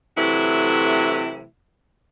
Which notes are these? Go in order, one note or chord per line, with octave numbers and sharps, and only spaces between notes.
C3 E3 F#3 A3 E4